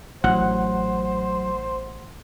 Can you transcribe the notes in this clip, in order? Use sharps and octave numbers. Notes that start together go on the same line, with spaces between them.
A1 F#3 C5 F#5